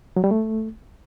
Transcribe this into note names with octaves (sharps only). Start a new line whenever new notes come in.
F#3
G3
A3